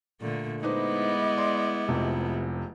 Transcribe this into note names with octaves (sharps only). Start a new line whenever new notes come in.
A#2 D3 A3
G#3 B3 D#4 E4 B4 C5 D#5 D6
D5 C6
F1 C3 F3